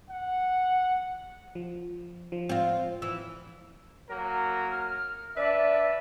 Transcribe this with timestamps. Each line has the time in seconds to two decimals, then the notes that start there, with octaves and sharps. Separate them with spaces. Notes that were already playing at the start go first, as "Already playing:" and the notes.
0.10 F#5
1.55 F3
2.32 F3
2.49 C4 F4
3.02 E3 E6
4.10 F#3 A#3 A#4
4.71 F6
5.37 D4 B4 D5 E5